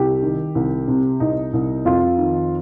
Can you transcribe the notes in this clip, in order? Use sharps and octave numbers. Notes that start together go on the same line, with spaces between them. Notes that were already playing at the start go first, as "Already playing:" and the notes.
Already playing: C2 G4
D#3
C2
C3
C2 D#4
C2
F2 F4
D#3